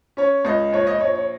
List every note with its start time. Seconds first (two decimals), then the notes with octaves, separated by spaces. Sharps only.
0.17 C#4 C#5
0.45 C#2 D#5
0.73 A#1 C#5
0.87 D#5
1.00 A#1 C#5
1.15 C#5